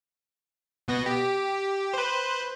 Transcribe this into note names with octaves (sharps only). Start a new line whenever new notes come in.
B2 B3 A#6
G4
B4 C5